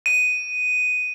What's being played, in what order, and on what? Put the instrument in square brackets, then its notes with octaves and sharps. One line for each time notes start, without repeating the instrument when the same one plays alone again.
[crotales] D#7